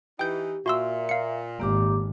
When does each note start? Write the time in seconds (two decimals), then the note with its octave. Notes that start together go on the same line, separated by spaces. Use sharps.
0.19 E3 D#4 G4 G5 G6
0.66 A#2 F#4 E5 C6 E6
1.09 F5 C#7
1.60 G#1 A#3 G4 D6